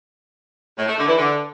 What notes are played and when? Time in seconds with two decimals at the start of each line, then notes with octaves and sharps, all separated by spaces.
0.78 A2
0.88 A3
0.98 D3
1.08 E3
1.17 D3